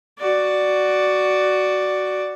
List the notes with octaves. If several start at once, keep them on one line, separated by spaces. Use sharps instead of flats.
F#4 D5